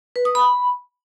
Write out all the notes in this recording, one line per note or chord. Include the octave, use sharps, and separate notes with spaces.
B4
D#6
B5